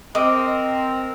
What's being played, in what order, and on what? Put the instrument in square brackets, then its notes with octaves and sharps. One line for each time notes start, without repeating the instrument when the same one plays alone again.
[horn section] C4 A#4 [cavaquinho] D#5 D6